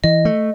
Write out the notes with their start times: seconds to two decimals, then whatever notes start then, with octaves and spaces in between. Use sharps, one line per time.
0.04 E3 D#5
0.25 A3